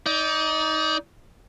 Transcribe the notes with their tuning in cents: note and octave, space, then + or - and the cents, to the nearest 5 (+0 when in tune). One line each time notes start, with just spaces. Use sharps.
D#4 +15 D5 -20